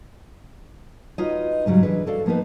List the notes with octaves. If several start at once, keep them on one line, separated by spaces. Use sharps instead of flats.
D#4 F4 F#4 B4 C#5 D#5
G#2 C#3 F#3 G3
E3 D4 G#4 B4
F#4 A4 D5 F5
F3 A#3 B3 D#4 B4